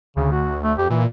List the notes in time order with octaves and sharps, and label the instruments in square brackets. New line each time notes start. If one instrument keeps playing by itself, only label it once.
[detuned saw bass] D2 [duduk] C#3
[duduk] F#4
A3
[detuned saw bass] F2 [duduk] G4
[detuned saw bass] A#2 [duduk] E3